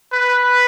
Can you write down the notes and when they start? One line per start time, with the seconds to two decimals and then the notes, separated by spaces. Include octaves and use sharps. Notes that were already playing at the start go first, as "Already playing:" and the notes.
0.13 B4